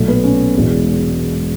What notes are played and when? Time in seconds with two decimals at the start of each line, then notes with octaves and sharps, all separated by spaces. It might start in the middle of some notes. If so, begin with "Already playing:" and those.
Already playing: B1 A#2 F#3 A3
0.08 B3
0.24 C#4
0.55 E1 E2 B2 G#3